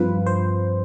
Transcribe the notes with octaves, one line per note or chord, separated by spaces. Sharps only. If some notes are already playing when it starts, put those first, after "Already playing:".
Already playing: G2 F3 C4 F4 B4
C5